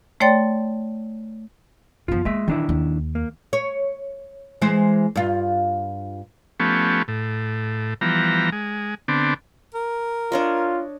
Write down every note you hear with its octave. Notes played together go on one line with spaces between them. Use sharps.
A3 C#5 D5 G5 C6 A6
F#2 F3 B3 F4
G#3 A#3 F4 E5
D#3 E3 D4 E4
D#2
A#3
C#5
E3 G#3 C5
G2 F4
F3 A3 B3 C#4 G4
A2
E3 F3 G3 B3 A#5
G#3
D3 B3 C4 D4
A#4
D4 F4 C#5 D#5